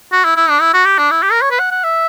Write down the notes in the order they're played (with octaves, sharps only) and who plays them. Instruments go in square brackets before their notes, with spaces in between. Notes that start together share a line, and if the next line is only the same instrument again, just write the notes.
[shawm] F#4
E4
E4
D4
E4
F#4
G4
D4
E4
G4
A#4
C#5
B4
F#5
F#5
E5